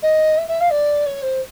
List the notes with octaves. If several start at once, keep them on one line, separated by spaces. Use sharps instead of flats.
D#5
E5
E5
F5
D5
C#5
C5